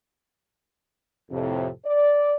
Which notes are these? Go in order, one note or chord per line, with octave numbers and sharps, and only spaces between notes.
F2 A2 C3
D5